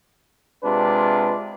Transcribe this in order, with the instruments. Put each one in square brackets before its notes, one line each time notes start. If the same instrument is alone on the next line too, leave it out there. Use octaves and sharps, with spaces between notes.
[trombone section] C3 G#3 D4 F4 B4